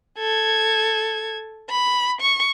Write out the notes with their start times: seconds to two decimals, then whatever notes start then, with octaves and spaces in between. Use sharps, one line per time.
0.18 A4 G#6
1.70 B5
2.20 C#6